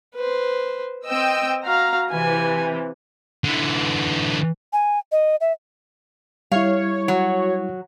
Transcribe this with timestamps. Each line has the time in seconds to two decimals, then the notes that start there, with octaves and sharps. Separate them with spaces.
0.15 B4 C5
1.06 C4 D#5 G5 E6
1.64 F#4 F5 A#5
2.11 C3 E3 G#5
3.44 D3 E3
4.73 G#5
5.12 D#5
5.41 E5
6.52 G3 E4 C#5 F5
7.08 F#3 F#4